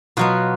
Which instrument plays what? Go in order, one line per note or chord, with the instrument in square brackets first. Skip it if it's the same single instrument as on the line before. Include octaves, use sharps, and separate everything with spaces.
[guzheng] B2 F#3 B3 F4